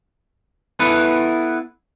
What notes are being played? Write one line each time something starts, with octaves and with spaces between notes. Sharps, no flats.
B3 E4 A4 B4